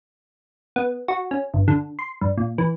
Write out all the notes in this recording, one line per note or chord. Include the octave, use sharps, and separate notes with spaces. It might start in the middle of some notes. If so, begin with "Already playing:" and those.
B3
F#4
C#4
G1
D3
C6
G2
A#2
E3